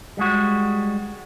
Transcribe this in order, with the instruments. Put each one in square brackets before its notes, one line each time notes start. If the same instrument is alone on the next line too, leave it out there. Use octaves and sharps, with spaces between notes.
[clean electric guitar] G3 G#3 F#4